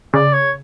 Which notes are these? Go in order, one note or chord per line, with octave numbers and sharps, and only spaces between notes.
C#3 D5
C#5